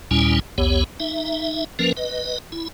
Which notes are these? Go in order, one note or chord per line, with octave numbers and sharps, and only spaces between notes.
D#2 A#2 G3 C#4 E4 G#5
B1 E2 B3 G4 C#5
D#4 E5
F3 A#3 C#4 A#4 B4
B4 D#5
E4